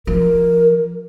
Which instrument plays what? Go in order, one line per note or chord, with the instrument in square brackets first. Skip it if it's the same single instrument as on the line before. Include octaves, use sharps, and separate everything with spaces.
[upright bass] F3 [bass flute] A#4